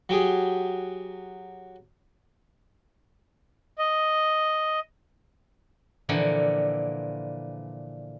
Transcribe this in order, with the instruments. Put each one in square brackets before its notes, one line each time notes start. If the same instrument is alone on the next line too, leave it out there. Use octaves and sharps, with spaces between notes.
[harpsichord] F#3 G4 G#4
[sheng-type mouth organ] D#5
[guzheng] A#2 D3 E3 F3 A#3